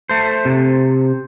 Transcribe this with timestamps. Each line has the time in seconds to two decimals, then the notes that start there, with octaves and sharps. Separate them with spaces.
0.09 A3 C5
0.45 C3